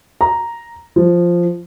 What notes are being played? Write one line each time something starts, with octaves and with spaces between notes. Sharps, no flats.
A#5
F3